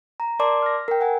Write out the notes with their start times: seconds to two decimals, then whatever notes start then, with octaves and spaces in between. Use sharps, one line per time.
0.20 A#5
0.39 A#4 D5 A5 C6 D6
0.62 F6 A#6
0.88 A#4 G5
1.01 F#5 G#5